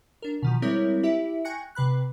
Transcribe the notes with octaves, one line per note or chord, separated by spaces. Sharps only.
D4 A#4
B2 D#3 F3
G3 G#3 C4 E4 A#4 C#5
E4 G4 E5
G5 G#5 C#6 F#6 A#6 C#7
C3 B4 B5 F#6